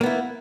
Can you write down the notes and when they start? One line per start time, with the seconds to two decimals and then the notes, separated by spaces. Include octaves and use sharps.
0.01 A#3
0.03 B3
0.06 E4